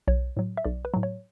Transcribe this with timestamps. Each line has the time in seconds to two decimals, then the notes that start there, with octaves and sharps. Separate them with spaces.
0.07 B1 C#5
0.37 A2 F#3
0.57 E5
0.64 B1 D5
0.85 B4
0.94 A2 F#3
1.03 C#5